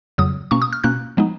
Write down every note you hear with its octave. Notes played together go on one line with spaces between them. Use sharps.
F2 C#3 F#3 D#6
B2 A#3 C#4 C#6
D#6
F6
B2 A#3 C#4 F#6
F3 G#3 B3 D#4